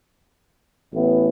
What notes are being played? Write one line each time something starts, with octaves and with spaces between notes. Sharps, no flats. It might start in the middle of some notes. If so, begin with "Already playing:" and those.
A1 A2 E3 B3